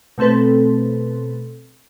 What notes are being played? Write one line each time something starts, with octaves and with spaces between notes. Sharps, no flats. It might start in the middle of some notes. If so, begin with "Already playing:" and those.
B2 A3 C4 A4 B4